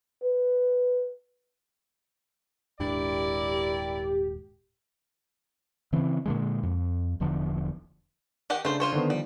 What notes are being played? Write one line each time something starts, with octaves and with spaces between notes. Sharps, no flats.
B4
D#1 G#2 D4 E4 G4 A#4 D5
C#3 E3 C4
A#2 D3 G#3
F2
E1 E2 D3 F3
D#3 G4 F#5
C#3 A3 D4 C5
F4 C5 C#5
D3 D#3 B3
F3 G3